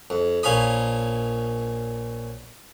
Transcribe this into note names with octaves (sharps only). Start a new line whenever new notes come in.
F2
A#1 A#2 C#4 F5 B5 D#6